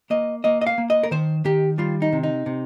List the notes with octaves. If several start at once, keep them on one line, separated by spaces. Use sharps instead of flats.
A#3 D#5
A#3 D#5
D#5
F5
A#3
D#5
A#4
D#3 C5
D#3 G4
G3 F4
D#4
C3
D#4
C3